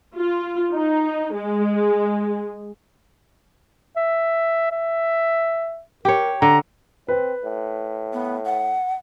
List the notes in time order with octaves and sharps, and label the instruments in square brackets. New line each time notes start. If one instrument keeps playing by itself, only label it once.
[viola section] F4
D#4
G#3
[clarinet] E5
E5
[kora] G4 C#5 [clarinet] A#4
[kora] D3 [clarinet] A#5
[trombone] C4 [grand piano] B4
[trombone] A2
[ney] B3
F#5